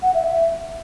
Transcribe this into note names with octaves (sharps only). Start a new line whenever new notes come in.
F#5
E5
E5